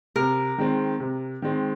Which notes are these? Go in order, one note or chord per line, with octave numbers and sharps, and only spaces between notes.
C3 A#4
D#3 G#3 C4
C3
D#3 G#3 C4